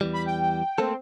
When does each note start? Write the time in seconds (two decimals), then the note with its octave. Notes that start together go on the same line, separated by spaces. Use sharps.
0.01 E2 E3 G3
0.13 B5
0.25 G5
0.78 A3 A#3 C4 A4